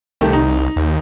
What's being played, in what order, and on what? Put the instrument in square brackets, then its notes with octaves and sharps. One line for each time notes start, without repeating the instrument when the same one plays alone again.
[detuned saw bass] C2 [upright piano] D#3 A3 G4
[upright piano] D#4
[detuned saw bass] D#2